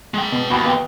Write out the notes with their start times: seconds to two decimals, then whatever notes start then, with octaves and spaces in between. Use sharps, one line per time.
0.14 G#3 G5
0.32 B2
0.50 D#2 F#4 B5
0.65 B3 G5